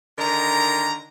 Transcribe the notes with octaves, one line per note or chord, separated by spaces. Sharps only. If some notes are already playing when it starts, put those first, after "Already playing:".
D3 D#3 G#3 A#4 A#5